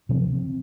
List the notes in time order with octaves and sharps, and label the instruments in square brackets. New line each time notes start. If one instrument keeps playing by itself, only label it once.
[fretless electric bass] C3 F3 C4